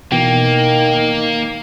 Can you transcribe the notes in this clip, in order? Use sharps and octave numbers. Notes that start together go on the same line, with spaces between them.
B2 D#3 E3 A#3 G5